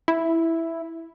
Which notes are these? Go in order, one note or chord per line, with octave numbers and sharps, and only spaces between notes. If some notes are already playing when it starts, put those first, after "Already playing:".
E4